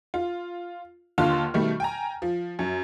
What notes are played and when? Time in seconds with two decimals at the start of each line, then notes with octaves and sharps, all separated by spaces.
0.14 F4
1.18 D#2 D3 F4 A5 C6 F6
1.54 B2 D#3 G3 A3
1.80 G5 G#5 A#5
2.22 F3
2.59 F#2